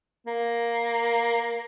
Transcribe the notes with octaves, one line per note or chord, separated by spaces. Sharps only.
A#3